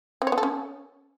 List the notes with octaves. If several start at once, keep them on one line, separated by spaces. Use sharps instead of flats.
C4
C#5
B3
A4
C#4